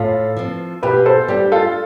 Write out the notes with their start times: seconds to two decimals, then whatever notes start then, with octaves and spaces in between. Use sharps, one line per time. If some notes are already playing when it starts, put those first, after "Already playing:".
Already playing: A2 F4 A4
0.37 F3 C4
0.83 B2 G4 B4
1.06 A4 C5
1.28 G3 D4 G4
1.52 F4 A4